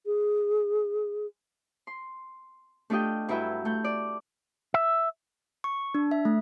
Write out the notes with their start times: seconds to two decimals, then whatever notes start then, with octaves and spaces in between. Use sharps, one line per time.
0.06 G#4
1.87 C6
2.90 A3 D4 F4 G4 D#5 G5
3.29 G2 F#3 E4 B4 E5 G5
3.65 A3 G6
3.84 D5
4.74 E5
5.64 C#6
5.94 D4
6.11 E5
6.25 A3